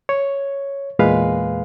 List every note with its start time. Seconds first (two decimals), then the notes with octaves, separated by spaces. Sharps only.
0.09 C#5
0.99 E2 A#2 G#3 B4 F5